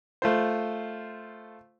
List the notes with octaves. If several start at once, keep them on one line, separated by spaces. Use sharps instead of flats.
A3 F4 C5